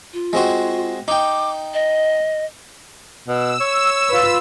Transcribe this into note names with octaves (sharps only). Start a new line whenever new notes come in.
F4
G#3 C4 F#4
D#4 G5 D6
D#5
B2 E6
C#5
F4 B4